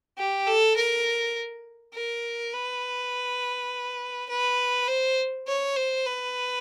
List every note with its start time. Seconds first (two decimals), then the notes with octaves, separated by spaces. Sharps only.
0.17 G4
0.47 A4
0.76 A#4
1.94 A#4
2.53 B4
4.29 B4
4.88 C5
5.47 C#5
5.76 C5
6.05 B4